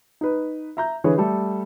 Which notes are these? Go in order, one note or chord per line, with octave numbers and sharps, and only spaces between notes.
D#4 B4
E5 A#5 G6
D3 E3 G#4 B4 C#5
G3 A3 A4